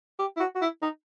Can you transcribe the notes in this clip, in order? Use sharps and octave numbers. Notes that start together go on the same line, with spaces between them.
G4
E4
F#4
F#4
E4
D#4